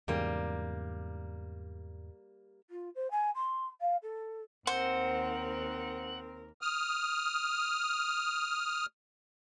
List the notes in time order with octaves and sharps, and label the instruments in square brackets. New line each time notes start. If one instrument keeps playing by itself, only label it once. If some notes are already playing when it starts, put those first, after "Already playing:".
[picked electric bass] E2 G#2 C#3 [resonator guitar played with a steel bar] G3 A#3
[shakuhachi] F4
C5
G#5
C6
F5
A4
[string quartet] D#2 A#4 [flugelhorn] C4 [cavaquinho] C5 [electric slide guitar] F#5
[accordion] D#6 F6